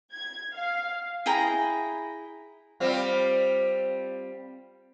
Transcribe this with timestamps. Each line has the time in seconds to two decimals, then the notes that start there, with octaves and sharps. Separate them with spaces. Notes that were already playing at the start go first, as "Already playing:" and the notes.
0.13 G#6
0.54 F5
1.26 E4 G#4 G5 A#5
2.80 G3 C4 F4